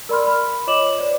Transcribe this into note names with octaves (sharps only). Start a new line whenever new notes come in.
A#4 D5 B5 C6 F6
B5
F4 C#5 D#5 D6 E7 F#7
C5 D5